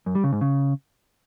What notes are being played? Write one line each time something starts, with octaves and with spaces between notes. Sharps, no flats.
F#2
G3
C#3
G#2
C#3